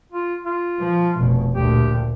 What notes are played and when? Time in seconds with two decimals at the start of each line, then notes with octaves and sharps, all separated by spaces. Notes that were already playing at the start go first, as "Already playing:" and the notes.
0.12 F4
0.45 F4
0.80 F3
1.18 F1 B2
1.55 D2 A#2 G4